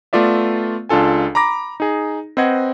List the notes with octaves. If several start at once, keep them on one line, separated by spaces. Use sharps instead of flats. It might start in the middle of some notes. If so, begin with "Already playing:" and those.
A3 B3 F4 D5 E5
C#2 D4 F4 A4 G#5
A#5 B5 D6 A#6
D#4 G#4
C4 B4 C5 D#5 F#5 G#6